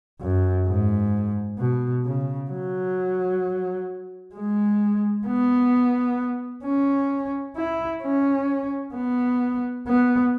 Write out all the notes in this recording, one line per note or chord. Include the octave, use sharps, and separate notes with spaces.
F#2
G#2
B2
C#3
F#3
G#3
B3
C#4
E4
C#4
B3
B3